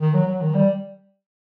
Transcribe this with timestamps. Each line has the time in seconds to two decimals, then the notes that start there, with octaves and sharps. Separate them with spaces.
0.01 D#3
0.14 F#3
0.27 F#3
0.41 D#3
0.55 G3